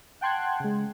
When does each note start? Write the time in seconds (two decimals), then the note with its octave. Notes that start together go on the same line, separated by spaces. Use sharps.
0.21 F#5 G5 A5 C6 F#6 G#6
0.60 C#3 G#3